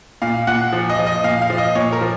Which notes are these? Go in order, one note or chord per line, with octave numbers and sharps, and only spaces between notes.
A#2 F5
A#2 F#5
F3
D#5
F3
D#5
A#2 F5
F5
F3
D#5
A#2 C#5
A#4
F3